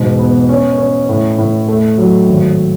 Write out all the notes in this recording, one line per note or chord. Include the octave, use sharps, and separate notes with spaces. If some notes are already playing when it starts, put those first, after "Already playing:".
Already playing: E1 G#2 B2
B3
C#4
C#4
A2
A2
A3
F#3
G#1